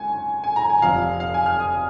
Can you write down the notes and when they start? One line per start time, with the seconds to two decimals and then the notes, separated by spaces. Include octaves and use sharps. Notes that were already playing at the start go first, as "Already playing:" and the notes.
Already playing: C#2 G#5 C#6
0.44 G#5
0.56 A#5
0.70 G#5
0.82 F1 F2 F3 F5
1.20 F5
1.34 G#5
1.46 F6
1.60 D#6